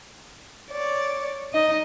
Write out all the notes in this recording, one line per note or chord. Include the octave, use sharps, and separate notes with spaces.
C#5 D5
D#4 D#5